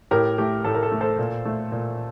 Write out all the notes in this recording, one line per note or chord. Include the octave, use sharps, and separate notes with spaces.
A2 G4 A#4
A3 G4
A2 A4
A#4
A4
A3
A4 C5
A#2
A3
A#2